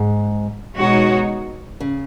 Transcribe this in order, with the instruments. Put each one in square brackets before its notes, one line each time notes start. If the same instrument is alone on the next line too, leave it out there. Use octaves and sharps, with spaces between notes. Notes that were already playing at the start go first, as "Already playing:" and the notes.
Already playing: [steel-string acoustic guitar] G#2
[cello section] B2 G#3 D#4 F#4 C#5
[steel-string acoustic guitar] C#3